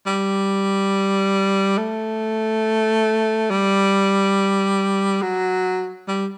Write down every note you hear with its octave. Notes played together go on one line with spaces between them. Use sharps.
G3
A3
G3
F#3
G3